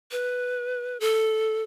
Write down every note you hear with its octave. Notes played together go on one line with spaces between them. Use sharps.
B4
A4